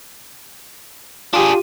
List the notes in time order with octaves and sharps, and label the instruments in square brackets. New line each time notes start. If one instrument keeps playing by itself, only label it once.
[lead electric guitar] D4 G#4 [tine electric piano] F4 G4